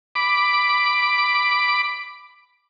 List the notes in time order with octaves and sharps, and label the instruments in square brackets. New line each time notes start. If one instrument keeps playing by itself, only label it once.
[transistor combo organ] B5 D6